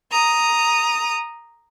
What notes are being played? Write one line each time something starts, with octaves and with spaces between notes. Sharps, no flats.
A#5 D#6